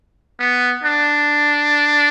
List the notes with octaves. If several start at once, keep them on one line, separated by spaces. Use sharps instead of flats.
B3
D4